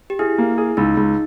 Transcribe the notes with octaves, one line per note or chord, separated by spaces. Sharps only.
G4
E4 G#4
A#3
G#4
C#2 D#4
C#2